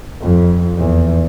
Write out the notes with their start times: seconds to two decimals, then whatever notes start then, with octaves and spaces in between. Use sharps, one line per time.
0.21 F2
0.77 E2